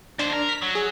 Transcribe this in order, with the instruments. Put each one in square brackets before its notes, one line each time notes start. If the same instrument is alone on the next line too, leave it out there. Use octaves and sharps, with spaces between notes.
[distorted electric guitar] D#2 C5 [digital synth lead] D4
[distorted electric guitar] A#4
[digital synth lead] B6
[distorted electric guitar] F#3
[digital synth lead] G#4